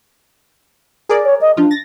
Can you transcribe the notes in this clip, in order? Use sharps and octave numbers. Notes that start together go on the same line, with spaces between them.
G#4 A#4 D5
C#5
D#5
F3 D4 F4
A6 A#6